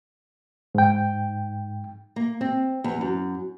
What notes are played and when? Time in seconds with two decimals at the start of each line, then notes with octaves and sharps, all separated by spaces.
0.75 G#2 G5
2.16 A#3
2.41 C4
2.84 E2
3.01 F#2